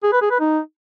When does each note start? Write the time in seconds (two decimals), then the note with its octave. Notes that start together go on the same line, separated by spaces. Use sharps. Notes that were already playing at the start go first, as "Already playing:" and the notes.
0.03 G#4
0.13 B4
0.22 G#4
0.31 B4
0.40 D#4